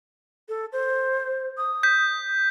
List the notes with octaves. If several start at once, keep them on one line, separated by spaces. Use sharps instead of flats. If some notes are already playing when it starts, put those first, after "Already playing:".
A4
C5
D#6
G6 B6